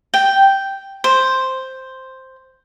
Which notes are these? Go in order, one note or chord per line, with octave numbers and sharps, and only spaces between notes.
G5
C5